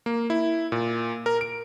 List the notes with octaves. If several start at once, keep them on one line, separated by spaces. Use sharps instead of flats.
A#3
E4
A#2
A#4
D7